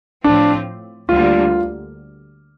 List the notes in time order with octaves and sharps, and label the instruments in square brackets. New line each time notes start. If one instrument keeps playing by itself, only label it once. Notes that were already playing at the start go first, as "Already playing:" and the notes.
[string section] A2 F3 C4 F4 [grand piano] D4
[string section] D2 D3 G3 A#3 [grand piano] F4